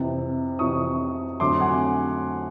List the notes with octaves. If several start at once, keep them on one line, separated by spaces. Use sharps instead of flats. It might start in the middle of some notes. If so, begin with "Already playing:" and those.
Already playing: F2 C3 E3
F2 C3 E3 C#6 D#6
F2 D3 F#3 A3 C6 D6
F#5 G#5